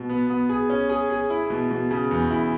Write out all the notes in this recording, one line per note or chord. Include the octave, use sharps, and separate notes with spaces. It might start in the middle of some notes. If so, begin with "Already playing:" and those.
Already playing: B2
B3
B3
G#4
C#4
G#4
G#4
E4
B2
B2
C#3
E2
E4